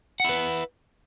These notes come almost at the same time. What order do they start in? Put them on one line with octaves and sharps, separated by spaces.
F#5 E4 B4